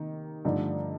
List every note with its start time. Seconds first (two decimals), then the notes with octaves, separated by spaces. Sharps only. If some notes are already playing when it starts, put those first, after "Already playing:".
Already playing: C3 D#3 A#3 D#4
0.45 G2 D3 F3 A3 D#4